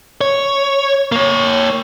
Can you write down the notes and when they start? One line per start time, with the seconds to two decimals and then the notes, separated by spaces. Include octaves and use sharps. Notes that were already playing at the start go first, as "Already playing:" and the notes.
0.21 C#5
1.12 A#3 C#5